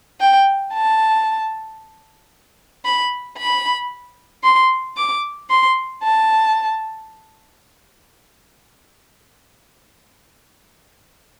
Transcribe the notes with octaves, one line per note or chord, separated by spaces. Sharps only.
G5
A5
B5
B5
C6
D6
C6
A5